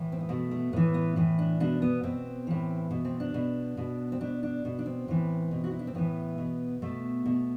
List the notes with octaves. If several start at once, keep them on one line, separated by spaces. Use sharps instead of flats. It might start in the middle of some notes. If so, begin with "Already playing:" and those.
Already playing: A2 E3
C4
B3
B2 A3
A3
A2 E3 B3
B3
A2 E3
D4
B2 D4
B3
B2 C4
A2 E3
B2
C4
D4
B2
B2
C4
B2 D4
D4
B2
D4
C4
A2 E3
B2
F#4
E4
D4
C4
A2 E3 B3
B2
B2 A3
B2